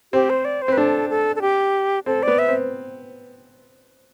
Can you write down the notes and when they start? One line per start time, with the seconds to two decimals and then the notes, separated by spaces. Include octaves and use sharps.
0.13 C4 G4
0.30 C5
0.45 D5
0.62 C5
0.68 C4
0.72 B4
0.77 D4 A4
1.10 A4
1.36 A4
1.42 G4
2.06 C4 A4
2.23 B3 D5
2.39 E5
2.49 C4